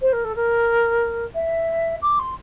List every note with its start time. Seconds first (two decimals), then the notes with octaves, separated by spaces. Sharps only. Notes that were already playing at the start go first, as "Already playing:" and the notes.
0.01 C5
0.12 A#4
0.24 A4
0.35 A#4
1.35 E5
2.02 D6
2.19 C6